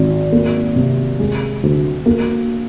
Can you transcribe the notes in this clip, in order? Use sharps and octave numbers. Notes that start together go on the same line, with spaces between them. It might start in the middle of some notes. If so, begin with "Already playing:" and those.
Already playing: G#1
A#3
C3
G#3
D2
A#3